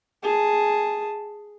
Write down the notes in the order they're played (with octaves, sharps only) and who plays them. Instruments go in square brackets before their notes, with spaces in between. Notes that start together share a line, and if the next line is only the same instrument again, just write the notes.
[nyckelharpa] G#4 A5